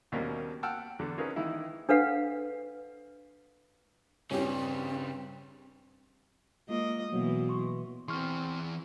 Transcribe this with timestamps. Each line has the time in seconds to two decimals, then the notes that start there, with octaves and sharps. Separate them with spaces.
0.12 D#2 B2 G3 A#3 C4 C#4
0.63 F#5 G5 A5 E6 F6
0.99 E2 D3
1.18 C4 C#4 D#4 G#4 A#4 B4
1.36 D#3 E3 A#3 D#4 E4
1.89 D4 A4 B4 F5 F#5
4.31 G2 C#3 G3 C4 C#4 G4
6.69 G#3 A#3 F4 D#5
7.13 B2 E3 F#3 A#3
7.49 C6 C#6
8.08 E3 C4 G#4 C6 C#6 F6